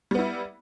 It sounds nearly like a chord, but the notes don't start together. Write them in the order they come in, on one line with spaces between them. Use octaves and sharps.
G3 B3 E4